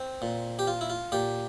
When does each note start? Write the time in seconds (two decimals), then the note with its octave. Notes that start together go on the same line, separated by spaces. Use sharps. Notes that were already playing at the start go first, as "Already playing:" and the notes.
Already playing: C4
0.22 A#2
0.59 G4
0.67 F4
0.81 E4
0.90 F4
1.12 A#2 G4